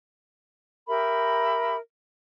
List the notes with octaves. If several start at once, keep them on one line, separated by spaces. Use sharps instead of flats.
G4 A#4 E5 B5